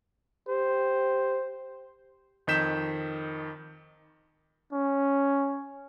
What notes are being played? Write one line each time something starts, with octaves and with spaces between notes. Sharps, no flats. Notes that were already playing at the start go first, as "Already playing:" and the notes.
G4 C5
F2 D#3 D#5 G6 B6 E7
C#4